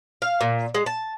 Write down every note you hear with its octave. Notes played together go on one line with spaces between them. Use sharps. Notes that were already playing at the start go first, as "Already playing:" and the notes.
F5
A#2
G#3
A5